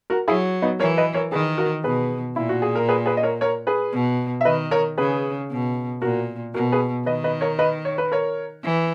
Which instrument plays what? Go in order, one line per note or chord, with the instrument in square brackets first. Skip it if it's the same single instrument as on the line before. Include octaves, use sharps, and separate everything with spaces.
[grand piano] F#4 A#4
[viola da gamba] F#3 [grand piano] E4 G#4
[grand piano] B3 D#4
[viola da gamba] E3 [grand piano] A#4 C#5
[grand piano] B4 D#5
A#4 C#5
[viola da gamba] D#3 [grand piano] G#4 B4
[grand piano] F#4 A#4
[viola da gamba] B2 [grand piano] G#4 B4
[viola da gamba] A#2 [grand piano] E4
[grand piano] F#4
G#4
A#4
G#4 B4
G#4 B4
D#5
A#4 C#5
A#4 C#5
G#4 B4
[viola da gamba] B2
[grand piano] E5
[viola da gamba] D#3 [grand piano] B4 D#5
[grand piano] A#4 C#5
[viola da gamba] C#3 [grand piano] G#4 B4
[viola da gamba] B2
[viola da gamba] A#2 [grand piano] F#4 A#4
[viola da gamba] B2 [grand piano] F#4 A#4
[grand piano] G#4 B4
[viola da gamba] D#3 [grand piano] B4 D#5
[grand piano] B4 D#5
A#4 C#5
B4 D#5
C#5
B4
A#4 C#5
[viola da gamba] E3